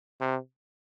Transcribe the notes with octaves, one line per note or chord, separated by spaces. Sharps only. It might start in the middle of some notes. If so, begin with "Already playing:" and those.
C3